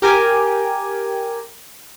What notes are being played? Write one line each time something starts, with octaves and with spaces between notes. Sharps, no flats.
G4 A#4 G5 G#5